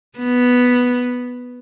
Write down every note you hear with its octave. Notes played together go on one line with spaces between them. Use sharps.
B3